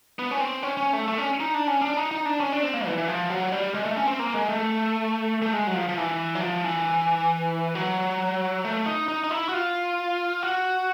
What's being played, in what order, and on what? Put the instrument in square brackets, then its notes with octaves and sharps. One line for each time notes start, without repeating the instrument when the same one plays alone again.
[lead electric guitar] B3
C#4
C4
C#4
C#4
A3
A3
C#4
D#4
D4
C#4
D4
D#4
D#4
D4
C#4
D4
C4
A#3
E3
E3
F3
F#3
G3
G#3
A3
C#4
C4
A#3
G#3
A3
A3
G#3
F#3
F3
F3
E3
F#3
F3
E3
F#3
A3
D#4
D#4
D#4
E4
F#4
F4
F#4